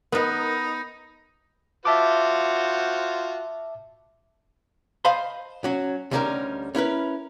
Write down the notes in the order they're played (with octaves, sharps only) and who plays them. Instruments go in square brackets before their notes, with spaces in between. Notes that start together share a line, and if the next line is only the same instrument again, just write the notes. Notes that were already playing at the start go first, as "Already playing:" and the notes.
[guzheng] B3 B4 [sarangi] D#4 [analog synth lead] A#4
[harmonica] F4 F#4 C5 [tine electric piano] E5 A5 D6
[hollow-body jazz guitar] C5 D#5 F5 A5 B5 C6
F#3 C#4
D2 D3 G3 C#4 D#4 A#4
C#4 E4 A#4 B4